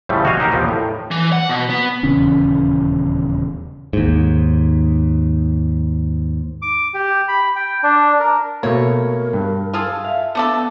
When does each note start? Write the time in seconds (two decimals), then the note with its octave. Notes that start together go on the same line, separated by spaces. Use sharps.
0.09 A2 C#3 F3 G3 A3
0.25 F#4 C#5 D#5 F5 G#5
0.40 D#4 G4 A#4 F5
0.52 D#2 A#2 F3 B3
0.69 A2
1.11 E3
1.32 F#5
1.49 B2
1.70 B3
2.03 D#1 E2 C#3 C#4
3.93 D#2 G#2
6.62 D6
6.94 G4
7.28 B5
7.56 G5
7.83 D4
8.20 A#4
8.63 B2 A3 A#3 A#4 C#5
9.33 G2
9.73 F4 G#4 A4
10.05 E5 F5
10.35 A3 B3 D4 A4